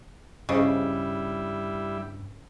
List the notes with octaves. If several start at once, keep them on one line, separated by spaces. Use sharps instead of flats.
G2 C#3 G3 E4 G#4 C5 D#5